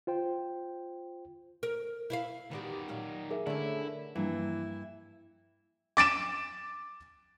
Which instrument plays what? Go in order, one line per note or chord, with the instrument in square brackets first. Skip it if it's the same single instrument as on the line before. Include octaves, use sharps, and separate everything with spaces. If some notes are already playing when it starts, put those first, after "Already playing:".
[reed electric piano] F4 C5 G5
[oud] A#4
E4 E5 F5
[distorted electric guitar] D#3 D5 [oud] B3 F#4 G4
[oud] A#2 F#3 F5
[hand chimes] G#4 A#4 E5
[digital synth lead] D3 [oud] A3 C#4 [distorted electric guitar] E4
[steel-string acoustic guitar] G2 [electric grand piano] E3 [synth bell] F3 A#3 [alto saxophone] E4
[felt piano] D6 A6 D7 E7